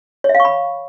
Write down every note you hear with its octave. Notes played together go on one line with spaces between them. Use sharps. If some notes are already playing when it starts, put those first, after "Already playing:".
C#5
E5
F5
C#6
B5